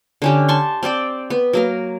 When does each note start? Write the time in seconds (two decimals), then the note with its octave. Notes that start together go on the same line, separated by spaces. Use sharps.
0.22 D3 C#4 G4
0.48 A5 C6 C#6
0.83 C4 C5 D5 G5
1.30 B3
1.53 F#3 A#3 A#4